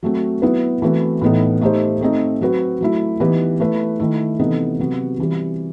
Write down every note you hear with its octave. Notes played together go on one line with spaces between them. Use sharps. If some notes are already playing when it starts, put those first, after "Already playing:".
F#3 A3 C4 F#4
F#3 B3 E4 B4
E3 A3 C4 F#4 B4
A2 E3 B3 D#4 A4
A3 D#4 G4 C5
A3 C4 D#4
F#3 C4 F#4 B4
F#3 A3 E4
E3 B3 D#4 G4 B4
A3 E4 B4
D#3 A3 E4
C3 E3 B3 D#4 A4
C3 F#3 B3 F#4
C3 E3 G3